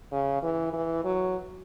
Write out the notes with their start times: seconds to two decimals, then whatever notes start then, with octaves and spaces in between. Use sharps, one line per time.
0.12 C#3
0.43 E3
0.73 E3
1.04 F#3